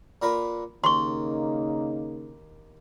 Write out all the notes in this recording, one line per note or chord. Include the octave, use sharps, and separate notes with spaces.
A#2 A#4 B4
D#2 C#3 A#3 D#4 C6 C#6